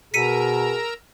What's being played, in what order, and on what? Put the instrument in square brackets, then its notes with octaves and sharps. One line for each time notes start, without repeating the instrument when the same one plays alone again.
[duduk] B2 [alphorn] G#4 [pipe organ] A#4 A#5 E6 [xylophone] B6 C#7 D#7